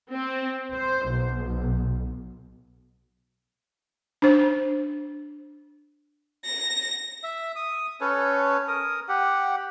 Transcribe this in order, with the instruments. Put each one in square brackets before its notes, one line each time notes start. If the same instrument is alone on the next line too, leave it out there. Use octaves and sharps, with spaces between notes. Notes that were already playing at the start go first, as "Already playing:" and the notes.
[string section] C4
C5
B1
[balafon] D4 C5
[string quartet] A#6
[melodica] E5
D#6
C#4 A4 B4 C#5
A#4 D#6
G4 F#5